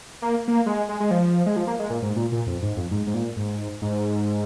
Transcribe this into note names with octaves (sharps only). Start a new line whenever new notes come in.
A#3
A#3
G#3
G#3
G#3
F3
G#3
F3
A#3
G#3
A#2
G#2
A#2
A#2
F2
G#2
F2
G#2
G#2
A#2
G#2
G#2